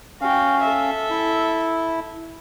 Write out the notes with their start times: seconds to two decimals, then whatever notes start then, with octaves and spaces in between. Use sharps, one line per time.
0.21 C#4 F#4 F5 G5
0.60 A4 E5
1.10 E4